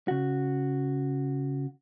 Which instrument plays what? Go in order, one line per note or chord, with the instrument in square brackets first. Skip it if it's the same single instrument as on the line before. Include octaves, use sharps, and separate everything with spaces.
[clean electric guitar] C#3 F#4